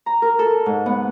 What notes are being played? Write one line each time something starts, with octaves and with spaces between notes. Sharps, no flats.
A#5
A#4
A4
G#2
B3